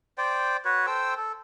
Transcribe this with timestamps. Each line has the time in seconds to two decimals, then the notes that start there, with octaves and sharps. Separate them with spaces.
0.18 C5 D5 G5
0.65 F#4 B4 C#5
0.86 A4 C5 G5 E6
1.17 A4